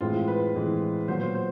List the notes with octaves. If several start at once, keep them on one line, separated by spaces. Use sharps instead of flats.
A2 E3 G#3 C4 F4
B4
A2 E3 G#3 C4
A#2 F#3 B3 C5
C5
C5